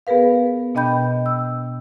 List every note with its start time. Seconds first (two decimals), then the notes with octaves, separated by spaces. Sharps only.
0.07 B3 G#4 A#4 B4 F5
0.75 B2 D4 D#5 G5 B5 G6
1.26 E6